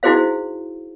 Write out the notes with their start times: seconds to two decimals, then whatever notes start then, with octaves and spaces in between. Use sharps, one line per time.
0.03 D#4 E4 F#4 G#4 C5 F5